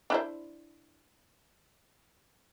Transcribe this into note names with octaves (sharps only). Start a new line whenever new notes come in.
D4 E4 C5